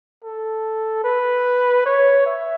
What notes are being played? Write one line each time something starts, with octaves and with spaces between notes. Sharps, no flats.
A4
B4
C#5
E5